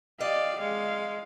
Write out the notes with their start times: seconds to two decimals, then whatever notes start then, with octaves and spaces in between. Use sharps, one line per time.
0.21 G4 D5 D#5 F5
0.60 G#3 F5